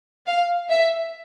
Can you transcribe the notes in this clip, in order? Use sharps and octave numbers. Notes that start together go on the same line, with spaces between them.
F5
E5